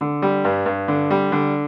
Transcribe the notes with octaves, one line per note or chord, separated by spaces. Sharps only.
D3
G3
G2
G2
D3
G3
D3